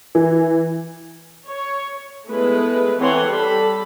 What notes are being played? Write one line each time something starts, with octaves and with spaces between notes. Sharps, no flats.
E3
C#5
G#3 A3 B3 E4 B4
E3 C4 A4 C#5 F#5 C6
G3 A4 B5